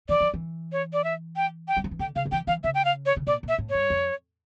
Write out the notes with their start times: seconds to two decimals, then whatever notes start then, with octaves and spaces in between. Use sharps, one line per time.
0.09 E3 D5
0.21 F3
0.34 E3
0.72 C#5
0.93 D5
1.04 E5
1.36 G5
1.68 G5
1.77 G3
1.84 F3
1.91 E3
1.99 D3 G5
2.16 C#3 F5
2.25 F3
2.32 E3 G5
2.47 E3 F5
2.64 C#3 E5
2.75 G5
2.85 F5
3.06 C#5
3.16 C#3
3.27 A#2 D5
3.43 A#2
3.48 E5
3.58 A2
3.70 G2 C#5
3.90 F2